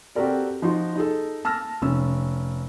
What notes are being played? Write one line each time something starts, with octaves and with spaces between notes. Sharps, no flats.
C4 F#4 G4 A4 A#4 D5
F3 D#4 F#4 C6
D#4 G#4 A4
A5 E6 F6 A#6
F1 C#4 E6